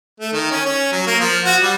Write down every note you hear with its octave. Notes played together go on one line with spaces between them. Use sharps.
A3
D#3
C#4
C#4
F#3
A#3
F3
F#4
G3